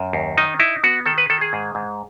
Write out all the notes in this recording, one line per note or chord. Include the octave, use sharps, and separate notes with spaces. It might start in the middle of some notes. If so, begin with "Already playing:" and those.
Already playing: F#2
D#2
D#3 D#4
D#4 E4
B3 F#4
D#3 A4
B4
D#3 A4
G#4
G#2
G#2